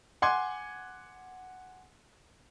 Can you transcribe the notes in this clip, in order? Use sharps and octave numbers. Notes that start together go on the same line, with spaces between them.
F#5 G#5 C6 D6 G#6